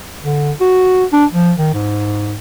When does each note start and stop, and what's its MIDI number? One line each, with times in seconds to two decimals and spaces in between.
0.22 0.51 50
0.61 1.05 66
1.13 1.25 62
1.32 1.53 53
1.58 1.72 51
1.74 2.36 44